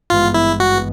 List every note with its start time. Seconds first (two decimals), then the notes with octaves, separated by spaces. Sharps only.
0.10 G#1 G2 E3 G#3 B3 F4
0.34 E4
0.60 F#4